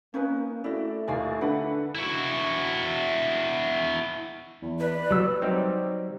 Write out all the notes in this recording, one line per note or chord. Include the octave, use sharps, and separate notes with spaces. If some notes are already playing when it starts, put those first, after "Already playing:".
A#3 C#4 D#4 B4
A3 E4 F#4 D5
D#2 F4 D5 F5 G#5
D3 D4 B4 F#5
E4 F#4
E2
B4 D5
F#3 G3 E6
F#3 G3 C4 D#4 G4